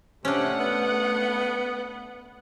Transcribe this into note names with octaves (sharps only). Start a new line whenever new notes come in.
C3 A3 C#4 D4 F#5
B3